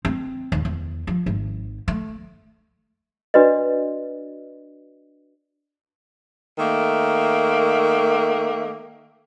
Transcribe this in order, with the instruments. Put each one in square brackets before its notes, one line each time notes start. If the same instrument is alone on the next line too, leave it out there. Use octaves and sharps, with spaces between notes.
[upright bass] C4
D#2
E2
F3
G#1
A3
[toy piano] D4 F#4 B4 D5 D#5
[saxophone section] D#3 A3 A#3